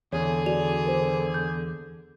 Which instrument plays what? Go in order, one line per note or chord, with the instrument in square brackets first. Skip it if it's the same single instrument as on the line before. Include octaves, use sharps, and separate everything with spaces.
[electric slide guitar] E2 [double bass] D3 [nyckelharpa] G#4 [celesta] C#5
[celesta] F#4 D5 F7
A#4 C5
G6